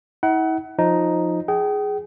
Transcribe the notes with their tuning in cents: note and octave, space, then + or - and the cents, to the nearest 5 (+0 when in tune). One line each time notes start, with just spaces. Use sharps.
E4 -45 F#5 +25
F3 +10 D#4 +0
G#4 +0 G5 -35